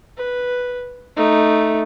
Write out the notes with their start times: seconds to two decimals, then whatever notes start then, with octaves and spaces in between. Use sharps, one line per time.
0.17 B4
1.16 A3 D#4